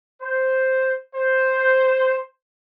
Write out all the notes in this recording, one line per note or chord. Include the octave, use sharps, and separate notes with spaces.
C5
C5